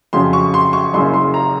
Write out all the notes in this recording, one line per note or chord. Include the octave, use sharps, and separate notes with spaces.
F2 C#3 F#3 C6
C#6
C6
C#6
F#1 F#2 C#3 C6
C6
A#5